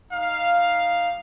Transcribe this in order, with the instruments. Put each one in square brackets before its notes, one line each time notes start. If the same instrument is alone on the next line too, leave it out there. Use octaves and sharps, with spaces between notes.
[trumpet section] G3 D#4 F5